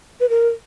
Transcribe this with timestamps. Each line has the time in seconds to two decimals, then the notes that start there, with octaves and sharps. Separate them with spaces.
0.20 B4
0.29 A#4